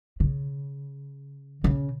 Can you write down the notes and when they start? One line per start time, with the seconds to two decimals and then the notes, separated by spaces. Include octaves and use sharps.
0.20 C#3
1.64 C#3